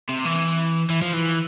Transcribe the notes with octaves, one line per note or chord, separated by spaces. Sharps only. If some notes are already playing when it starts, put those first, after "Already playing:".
C3
E3
E3
F3
E3